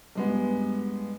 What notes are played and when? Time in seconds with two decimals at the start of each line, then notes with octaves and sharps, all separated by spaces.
0.15 G2 G#3 B3